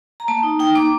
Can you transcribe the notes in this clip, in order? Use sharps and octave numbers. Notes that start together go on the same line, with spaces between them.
A#5
A#3 A5
D#4
D#4 G5
A#3 D6